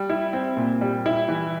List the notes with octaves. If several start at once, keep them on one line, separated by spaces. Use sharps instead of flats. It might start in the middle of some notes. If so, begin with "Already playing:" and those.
Already playing: G3
E4
C4
A#2
G3
E4
E3